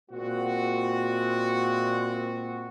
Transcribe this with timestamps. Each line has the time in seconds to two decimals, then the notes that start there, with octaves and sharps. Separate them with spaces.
0.11 A#2 G#3 C4 F#4